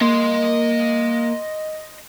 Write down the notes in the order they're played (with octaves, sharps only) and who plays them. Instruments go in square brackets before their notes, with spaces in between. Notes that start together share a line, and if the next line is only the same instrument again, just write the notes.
[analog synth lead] A#3 [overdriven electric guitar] D#5 C6